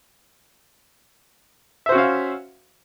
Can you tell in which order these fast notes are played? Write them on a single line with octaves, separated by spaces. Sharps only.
E5 C5 F#4 C#4 F5